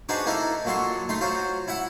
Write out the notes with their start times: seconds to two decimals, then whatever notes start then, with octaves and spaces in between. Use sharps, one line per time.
0.09 D4 D#4 F#4 G#4 B4 C5
0.26 A#3 D#4 E4 A4 A#4
0.65 A#2 F#3 F#4 A4 C6
1.09 A3 D#4 C6
1.20 F#3 F4 F#4 C5
1.68 E4 E5 F#5